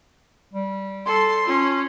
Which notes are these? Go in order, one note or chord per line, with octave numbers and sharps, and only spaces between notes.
G3
A4 C6
C#4 F4